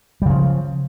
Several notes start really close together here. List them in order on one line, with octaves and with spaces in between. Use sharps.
G3 C#3 F3